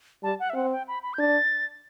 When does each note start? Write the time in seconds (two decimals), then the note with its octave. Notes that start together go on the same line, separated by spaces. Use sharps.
0.23 G3 A5
0.40 F#5
0.50 E5
0.55 C4 F#5
0.72 G5
0.88 B5
1.03 B5
1.14 G6
1.19 D4 A6